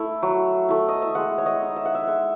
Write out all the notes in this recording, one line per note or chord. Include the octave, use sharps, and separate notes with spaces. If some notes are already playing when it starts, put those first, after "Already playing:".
Already playing: A3 E4
F#3
A3 E4
D#5
E5
G#3 F#5
C#5
D#5
D#4
E5
F#5
E5
G#3 E5